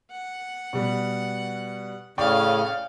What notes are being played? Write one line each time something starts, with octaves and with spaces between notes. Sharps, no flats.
F#5
B2 G3
A2 C#3 C#4 D5 F5 G5 C#6